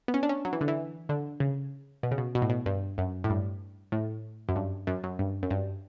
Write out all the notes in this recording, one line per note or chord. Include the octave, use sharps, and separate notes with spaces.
B3
C#4
D4
C#4
F#3
E3
D3
E3
D3
C#3
B2
C#3
B2
B2
A2
B2
G2
F#2
A2
G2
A2
F#2
G2
F#2
F#2
G2
F#2
G2